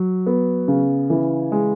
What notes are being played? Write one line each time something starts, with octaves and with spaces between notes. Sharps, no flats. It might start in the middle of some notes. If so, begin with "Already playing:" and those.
Already playing: F#3
B3
C#3
E3
G#3